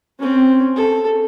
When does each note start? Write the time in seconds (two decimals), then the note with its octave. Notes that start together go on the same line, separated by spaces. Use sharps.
0.19 C4 C#4
0.76 A4